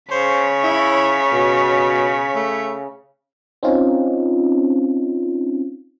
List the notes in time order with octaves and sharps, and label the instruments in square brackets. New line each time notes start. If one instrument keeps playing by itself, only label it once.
[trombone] C#3 [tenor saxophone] C5 [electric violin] C#5 B6
[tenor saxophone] E4
B2
A3
[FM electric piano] C4 C#4 D#4 F4